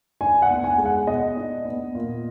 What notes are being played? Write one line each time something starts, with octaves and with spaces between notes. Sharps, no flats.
D4 G#5
F#5
B3
G#5
G#3 G#5
F#5
B2 D#5
D4
B3
A#2